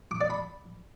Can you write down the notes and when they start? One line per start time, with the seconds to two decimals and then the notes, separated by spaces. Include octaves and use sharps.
0.11 D6
0.21 D5
0.30 B5